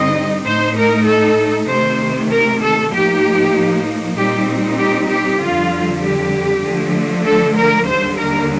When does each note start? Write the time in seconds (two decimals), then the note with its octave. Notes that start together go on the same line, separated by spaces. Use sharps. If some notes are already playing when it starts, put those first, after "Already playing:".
Already playing: G2 D3 G3 C4 D#4 D#5
0.46 A2 A3 D#4 C5
0.77 A#4
1.08 A4
1.69 C3 D#3 A3 C5
2.32 A#4
2.62 A4
2.93 A2 F3 A#3 D#4 G4
4.17 A#2 G3 C4 D#4 G4
4.78 G4
5.09 G4
5.40 F2 D3 G3 F4
6.02 G4
6.64 D3 F3 A3
7.25 A4
7.56 A#4
7.87 D#2 D3 G3 C5
8.18 A#4